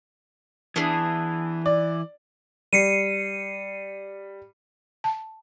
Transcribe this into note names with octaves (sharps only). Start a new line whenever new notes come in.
E3 B3 D4 G#4
D5
G3 C7 C#7 D#7
A5